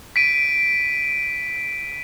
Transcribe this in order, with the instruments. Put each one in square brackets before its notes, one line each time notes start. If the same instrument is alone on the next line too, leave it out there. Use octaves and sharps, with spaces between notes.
[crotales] B6 D7 D#7